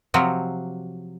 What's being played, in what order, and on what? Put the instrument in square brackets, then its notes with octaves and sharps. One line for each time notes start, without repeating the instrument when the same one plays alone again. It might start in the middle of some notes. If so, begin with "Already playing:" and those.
[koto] C3 F3 F#3